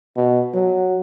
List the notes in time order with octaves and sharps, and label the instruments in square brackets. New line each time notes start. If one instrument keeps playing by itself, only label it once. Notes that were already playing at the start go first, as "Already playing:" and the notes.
[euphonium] B2
F#3